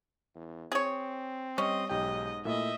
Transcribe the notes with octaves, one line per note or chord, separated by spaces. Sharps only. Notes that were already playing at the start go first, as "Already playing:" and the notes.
E2
C4 G#4 C#5
G3 C#4 D#5
B1 G#2 G4 D#5 G5
A#2 A3 E4 D#5 E5